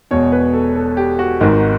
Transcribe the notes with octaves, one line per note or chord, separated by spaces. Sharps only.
E1 E2 B2 C#5
B4
A4
A4
G4
F#4
G#1 G#2 D#3